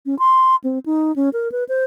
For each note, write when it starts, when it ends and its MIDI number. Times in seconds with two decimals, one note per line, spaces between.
0.06 0.17 61
0.19 0.56 84
0.64 0.79 60
0.86 1.14 63
1.16 1.29 61
1.33 1.51 70
1.52 1.64 71
1.69 1.85 72